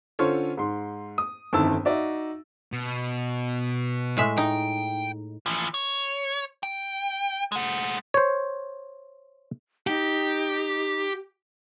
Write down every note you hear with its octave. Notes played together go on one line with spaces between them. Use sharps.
D3 C#4 F4 A4 C5 C#5
G#2 C6
D#6
G1 F2 D#3 E4 A5 E6
D#4 F#4 D5 E5
B2
A2 G#3 E5
D#4 G5
E3 F3
C#5
G5
G#3 F#5
C5 C#5
D#4 G4